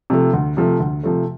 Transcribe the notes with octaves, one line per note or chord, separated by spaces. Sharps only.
C3 F3 A3
D2
C3 F3 A3
D2
C3 F3 A3